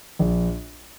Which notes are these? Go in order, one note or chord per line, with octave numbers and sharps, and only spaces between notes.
A#1